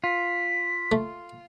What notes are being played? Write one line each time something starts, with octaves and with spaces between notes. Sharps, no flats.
F4 B6
A3